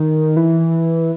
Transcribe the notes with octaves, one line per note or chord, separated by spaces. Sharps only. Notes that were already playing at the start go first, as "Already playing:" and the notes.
Already playing: D#3
E3